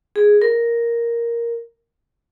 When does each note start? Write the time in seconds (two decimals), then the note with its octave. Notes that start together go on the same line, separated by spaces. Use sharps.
0.16 G#4
0.42 A#4